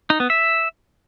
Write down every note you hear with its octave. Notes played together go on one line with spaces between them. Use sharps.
D#4
B3
E5